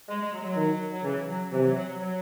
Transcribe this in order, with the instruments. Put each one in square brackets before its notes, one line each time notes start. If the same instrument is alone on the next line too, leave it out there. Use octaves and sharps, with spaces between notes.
[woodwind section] G#3
G#3
F#3
G#3
F#3
[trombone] D#3
[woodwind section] F#3
[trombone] C#3 [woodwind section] E3
[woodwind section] F#3
[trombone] C3 [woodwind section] E3
[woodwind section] F#3
F#3
F#3
F#3